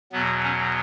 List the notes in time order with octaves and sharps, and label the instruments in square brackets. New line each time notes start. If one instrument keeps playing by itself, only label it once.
[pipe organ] E2 B2 F#3 B3
C#4